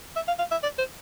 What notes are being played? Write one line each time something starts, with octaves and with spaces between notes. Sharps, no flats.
E5
F5
F5
E5
D5
C5